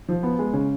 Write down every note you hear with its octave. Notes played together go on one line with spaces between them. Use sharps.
F3
B3
G#3
C#3